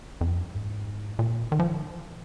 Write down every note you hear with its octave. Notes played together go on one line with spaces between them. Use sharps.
F2
F#2
G#2
A#2
D#3
F3